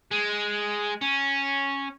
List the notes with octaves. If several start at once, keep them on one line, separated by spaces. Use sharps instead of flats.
G#3
C#4